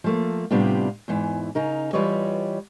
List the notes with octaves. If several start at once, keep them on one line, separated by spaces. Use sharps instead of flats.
F3 A3 A#3
A2 C3 G3 B3 D4 F4
E2 G#2 E3
C#3 D#4 A#4
E3 G3 F4 B4 C#5 D#5